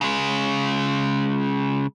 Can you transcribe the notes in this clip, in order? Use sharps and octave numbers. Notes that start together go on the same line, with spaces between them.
C#3 G#3